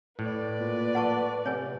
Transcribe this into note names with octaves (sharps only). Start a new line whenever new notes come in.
A2 B4 D5
A#2
F#5 A5 C#6
C3 C#5 G#5